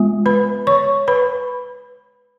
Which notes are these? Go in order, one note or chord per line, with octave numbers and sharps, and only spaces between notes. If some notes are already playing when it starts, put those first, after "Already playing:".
Already playing: G#3 B3 F4
B4 B5
C#5 C#6
B4 B5